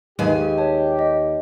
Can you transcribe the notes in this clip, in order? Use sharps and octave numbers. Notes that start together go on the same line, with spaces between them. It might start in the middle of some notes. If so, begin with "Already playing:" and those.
D#2 G#3 G4 B4 G#5
C#5 A5
D#5